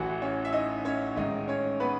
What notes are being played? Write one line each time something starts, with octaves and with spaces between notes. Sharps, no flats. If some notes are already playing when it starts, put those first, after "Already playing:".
Already playing: A1 A2 E3 F#4 F#5
C#4 C#5
E5
D#4 D#5
C#4 C#5
A1 G#2 D#3 D#4 D#5
C#4 C#5
B3 B4